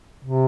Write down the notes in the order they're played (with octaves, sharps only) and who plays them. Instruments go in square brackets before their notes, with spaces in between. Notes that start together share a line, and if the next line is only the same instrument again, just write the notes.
[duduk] C3